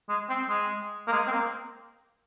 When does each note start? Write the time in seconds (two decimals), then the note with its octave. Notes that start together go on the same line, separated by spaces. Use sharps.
0.09 G#3
0.30 C4
0.49 G#3
1.07 A#3
1.12 G#3
1.28 C4
1.32 A#3